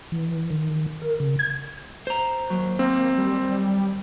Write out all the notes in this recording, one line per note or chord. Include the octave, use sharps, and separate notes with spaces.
E3
D#3
A#4
C#3
G#6
C5 A#5
D#2 F#3 G6
A#3 C4
G3